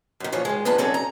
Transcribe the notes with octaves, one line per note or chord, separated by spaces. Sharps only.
F#2 D#3
A#2 E3 F3 C#5
D#3 G#3
E2 E3 F3 D4 D#4 B4
F#3 C4 C#4 D#4 A4 D5
A#5